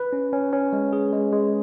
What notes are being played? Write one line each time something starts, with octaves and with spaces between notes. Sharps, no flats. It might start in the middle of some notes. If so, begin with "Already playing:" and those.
Already playing: B4
C#4
C#4
C#4
G#3
G#4
G#3
G#3